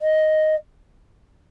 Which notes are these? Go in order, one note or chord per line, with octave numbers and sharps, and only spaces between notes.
D#5